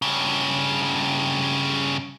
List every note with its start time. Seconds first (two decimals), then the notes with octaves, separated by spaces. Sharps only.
0.02 G2 C#3